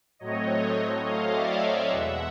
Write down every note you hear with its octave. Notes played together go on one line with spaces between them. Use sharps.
A2 F#3 A3 C4 C#5 D#5
D#5 F5
D5 E5
C#5 D#5
E2 B2 G#3 E5 F#5